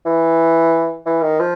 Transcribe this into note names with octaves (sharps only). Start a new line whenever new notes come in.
E3
E3
D#3
F3